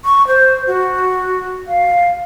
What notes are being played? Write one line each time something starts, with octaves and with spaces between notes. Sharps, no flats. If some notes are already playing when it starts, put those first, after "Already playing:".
C#6
C5
F#4
F5